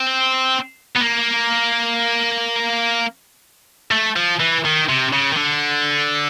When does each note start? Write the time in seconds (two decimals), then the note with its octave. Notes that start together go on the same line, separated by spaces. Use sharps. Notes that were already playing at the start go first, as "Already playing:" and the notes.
Already playing: C4
0.96 B3
1.01 A#3
3.91 A3
4.16 F3
4.40 E3
4.65 D#3
4.89 C3
5.13 C#3
5.32 D#3
5.37 D3